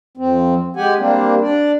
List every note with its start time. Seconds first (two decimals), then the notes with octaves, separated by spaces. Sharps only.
0.17 F2 C4
0.76 G#3 G4 F#5 G#5
0.98 G3 A#3 C4 D4
1.42 D4 D5